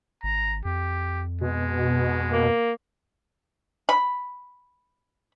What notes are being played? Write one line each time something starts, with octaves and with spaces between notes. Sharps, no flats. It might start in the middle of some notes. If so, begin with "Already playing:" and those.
G#1 A#5
F2 G4
B2 G#3
A#3
B5